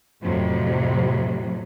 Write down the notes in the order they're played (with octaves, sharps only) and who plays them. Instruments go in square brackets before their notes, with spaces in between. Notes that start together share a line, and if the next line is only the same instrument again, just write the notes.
[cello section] F2 A2 C3 F#3